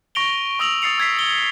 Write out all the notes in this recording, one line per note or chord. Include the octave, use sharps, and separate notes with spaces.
C#6 A#6 D7 F7 G7
C#6 D#6 E6 A#6 F7 F#7
D#6 A6 C7 C#7 F7
E6 G#6 B6 C7
G7